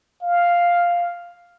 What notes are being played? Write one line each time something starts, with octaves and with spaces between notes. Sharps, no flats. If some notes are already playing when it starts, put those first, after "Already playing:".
F5